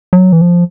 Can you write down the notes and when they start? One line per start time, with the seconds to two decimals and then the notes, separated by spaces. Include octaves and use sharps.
0.13 F#3
0.32 E3
0.41 F3